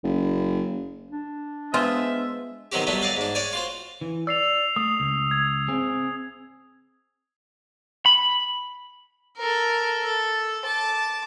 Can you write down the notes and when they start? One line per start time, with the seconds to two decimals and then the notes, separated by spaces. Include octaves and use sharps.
0.04 F#1
1.11 D4
1.74 G#3 B3 F4 C5 E5
2.72 B2 D#3 F#3 C4 F#4 G4
2.87 F#3 G3 A3 B3 D4
3.02 D5 D#5 F5 F#5
3.17 G#2 D4
3.35 C#5 D5 G5 G#5
3.53 F4 F#4 C5
4.01 E3
4.27 D5 E6 C7 F7
4.76 A3 D#6
5.00 C#2
5.31 G#6
5.68 C4 G#4
8.06 B5
9.37 A4 A#4
10.05 A4
10.65 A5 D6